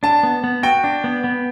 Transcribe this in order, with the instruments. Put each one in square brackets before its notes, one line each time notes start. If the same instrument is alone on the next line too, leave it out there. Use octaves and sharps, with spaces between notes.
[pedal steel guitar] D4 [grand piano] A5
[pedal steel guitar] B3
B3
[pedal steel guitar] F#4 [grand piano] G5
[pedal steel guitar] D4
B3
B3